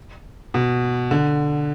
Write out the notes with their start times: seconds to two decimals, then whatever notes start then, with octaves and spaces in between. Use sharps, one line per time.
0.54 B2
1.11 D3